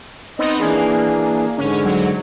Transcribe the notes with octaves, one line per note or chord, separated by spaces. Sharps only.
B3 C4 D#4 D#5
E3 A#3 D4 G#4
G#2 D3 C#4
F#3